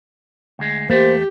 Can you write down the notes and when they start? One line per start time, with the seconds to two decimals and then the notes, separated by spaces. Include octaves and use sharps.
0.59 D2 G#3
0.90 E2 A3 A#3 G4 C5